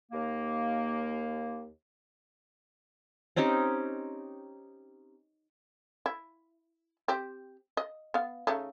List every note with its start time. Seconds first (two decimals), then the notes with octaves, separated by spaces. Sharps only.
0.12 D#2 A#3
3.36 C4 C#4 D#4 G4
6.06 E4
7.08 C4 G4
7.77 D#5
8.14 B3 F5
8.47 C#3 A3 D#4